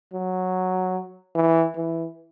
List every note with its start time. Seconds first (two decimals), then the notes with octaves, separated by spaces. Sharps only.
0.13 F#3
1.35 E3
1.76 E3